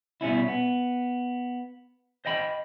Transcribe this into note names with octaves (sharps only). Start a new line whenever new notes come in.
B2 G3 C#4 E4
B3
C5 D#5 G5 B5